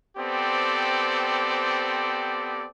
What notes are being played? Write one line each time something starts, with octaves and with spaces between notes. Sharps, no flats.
B3 C4 G4 A4 C5 D5